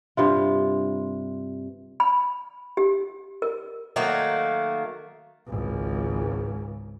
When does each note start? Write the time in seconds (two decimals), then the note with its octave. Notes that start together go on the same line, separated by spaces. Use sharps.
0.17 G2 C3 F4
2.00 B5
2.77 G4
3.42 A#4
3.96 D#3 F#3 A3 A#3
5.47 G#1 C#2